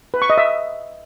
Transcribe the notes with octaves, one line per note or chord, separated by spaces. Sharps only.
B4
C#6
D#5
E5